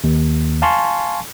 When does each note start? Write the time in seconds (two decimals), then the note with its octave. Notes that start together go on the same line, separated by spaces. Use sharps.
0.04 D#2
0.62 F5 G#5 A5 C6 C#6